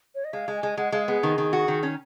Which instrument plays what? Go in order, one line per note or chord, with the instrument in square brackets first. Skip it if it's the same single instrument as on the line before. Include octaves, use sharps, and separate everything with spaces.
[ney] C#5
D#5
[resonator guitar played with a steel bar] G#3 [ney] F5
[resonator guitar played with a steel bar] G#3
[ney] G#5
[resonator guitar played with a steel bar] G#3
[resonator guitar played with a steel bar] G#3 [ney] F#5
[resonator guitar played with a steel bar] G#3 [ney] F5
[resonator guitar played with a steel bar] B3 [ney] G#4
[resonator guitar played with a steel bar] D#3
D#3
F#4
D#3
C#4